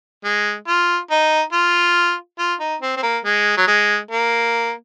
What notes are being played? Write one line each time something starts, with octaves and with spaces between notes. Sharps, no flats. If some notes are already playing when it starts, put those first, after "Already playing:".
G#3
F4
D#4
F4
F4
D#4
C4
C4
A#3
G#3
F#3
G#3
A#3